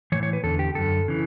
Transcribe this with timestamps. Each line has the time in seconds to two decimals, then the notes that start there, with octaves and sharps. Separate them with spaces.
0.12 A2 E3 C#5
0.23 C#5
0.33 B4
0.43 E2 D3 A4
0.59 G4
0.75 F#2 D3 A4
1.08 C#3 E3